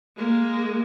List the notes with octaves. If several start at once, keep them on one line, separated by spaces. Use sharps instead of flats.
G#3 A#3